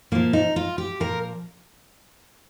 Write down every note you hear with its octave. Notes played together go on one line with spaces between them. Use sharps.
A#2 F3 A#3
D#4
F4
G4
A#2 F3 A#4